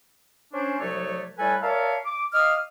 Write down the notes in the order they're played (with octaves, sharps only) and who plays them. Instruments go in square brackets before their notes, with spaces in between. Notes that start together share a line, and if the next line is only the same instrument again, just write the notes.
[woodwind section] C#4 D4 C5
C2 F3 F#3 A3 C#5 D5
A2 G3 A4 B4 G#5
A#4 C#5 D5 E5 F5 A5
D6
D#5 F5 D6 D#6 F6